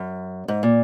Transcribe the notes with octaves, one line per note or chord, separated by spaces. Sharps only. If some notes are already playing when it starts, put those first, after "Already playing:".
Already playing: F#2
G#2
A#2